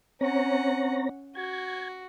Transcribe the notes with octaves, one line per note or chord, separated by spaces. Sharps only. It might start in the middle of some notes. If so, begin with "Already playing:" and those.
C4 C#4 C#5 F#5 A#5
F#4 G#6